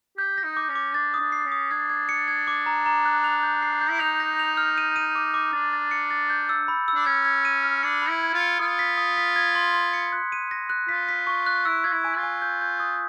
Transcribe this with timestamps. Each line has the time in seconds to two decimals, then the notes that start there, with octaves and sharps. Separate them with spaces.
0.17 G4 G6
0.38 A#6
0.43 D#4
0.57 D6
0.69 C#4
0.75 D6
0.94 D4 A6
1.14 D#6
1.20 D4
1.32 C7
1.46 C#4
1.52 D#6
1.71 D4 G#6
1.90 G#6
2.09 C#7
2.28 G#6
2.47 D6
2.66 A#5
2.86 A#5
3.06 F#6
3.24 F7
3.43 G6
3.62 C7
3.81 G6
3.90 E4
4.00 D#4 F7
4.20 A#6
4.39 F7
4.57 F6
4.78 D#7
4.96 D#7
5.15 D6
5.34 D6
5.53 D4 A6
5.73 A6
5.91 C#7
6.11 A6
6.30 G6
6.49 E6
6.68 B5
6.88 E6
6.95 D4
7.06 C#4 G#6
7.25 G#6
7.45 D#7
7.63 F6
7.83 D4 C#7
8.02 B5
8.09 E4
8.21 G#6
8.34 F4
8.40 C#7
8.59 F4 D#6
8.79 B6
8.98 D#6
9.17 B6
9.36 G#6
9.55 C6
9.74 C6
9.93 C#7
10.12 F#6
10.32 D#7
10.51 A#6
10.70 F#6
10.89 F4 B6
11.09 B6
11.27 C#6
11.46 F#6
11.65 E4 E6
11.84 F4 G#6
11.92 E4
12.04 G#5
12.17 F4
12.23 G#5
12.42 G6
12.61 G6
12.80 D#6